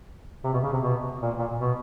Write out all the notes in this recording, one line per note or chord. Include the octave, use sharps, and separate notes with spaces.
C3
B2
C#3
C3
B2
A#2
A#2
B2